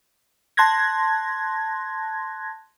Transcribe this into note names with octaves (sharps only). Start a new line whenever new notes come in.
A5 C6 F#6 G#6 A#6